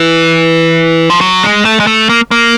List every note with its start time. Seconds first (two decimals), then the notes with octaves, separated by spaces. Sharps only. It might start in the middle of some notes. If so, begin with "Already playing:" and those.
Already playing: E3
1.10 F3
1.21 F#3
1.43 G#3
1.65 A3
1.80 G#3
1.87 A3
2.09 A#3
2.31 A#3